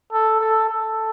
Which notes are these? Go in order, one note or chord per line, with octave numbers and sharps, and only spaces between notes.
A4
A4
A4